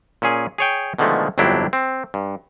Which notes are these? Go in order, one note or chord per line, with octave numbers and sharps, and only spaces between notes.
A#2 C#4 G#4
G#4 C#5 G5
B2 D3 D#3 F3 G#3 A3
G1 F2 F#3 D4 E4 G4
C4
G2